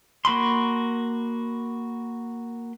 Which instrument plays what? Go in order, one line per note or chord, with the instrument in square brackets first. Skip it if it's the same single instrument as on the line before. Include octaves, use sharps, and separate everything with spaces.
[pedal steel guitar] A#3 F#4 B5 C6